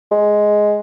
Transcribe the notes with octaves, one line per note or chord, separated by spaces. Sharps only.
G#3